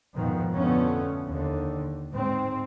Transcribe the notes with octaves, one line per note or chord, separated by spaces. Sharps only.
F2 G#2 B2 D#3 F3
F2 D3 A3 B3 C#4
D#2 D3
G#2 C4